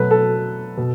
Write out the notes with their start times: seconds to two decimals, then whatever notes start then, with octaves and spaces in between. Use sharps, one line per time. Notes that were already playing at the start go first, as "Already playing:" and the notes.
Already playing: B2 F#3 A3 B4
0.11 A4
0.77 B2